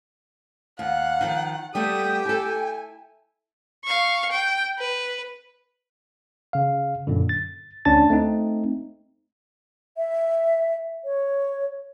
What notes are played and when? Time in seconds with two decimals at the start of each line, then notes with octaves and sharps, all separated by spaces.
0.79 D#2 F5 F#5
1.21 D#3 F3
1.75 G3 A3 B3 G4 G5 D#6
2.25 E4 A4 G#5
3.84 F5 C#6
4.32 G5
4.78 B4
6.53 C#3 F5
7.07 F#2 A#2 D3
7.29 A6
7.85 D2 C#4 D4 A5 A6
8.10 A3 C4 D#4
9.97 E5
11.05 C#5